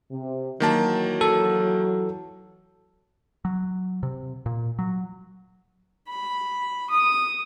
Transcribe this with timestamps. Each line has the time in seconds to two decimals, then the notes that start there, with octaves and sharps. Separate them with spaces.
0.11 C3
0.60 D#3 E3 F#3 A#3 A5
1.21 A4
3.45 F#3
4.03 C3
4.46 A#2
4.79 F#3
6.09 B5
6.90 D#6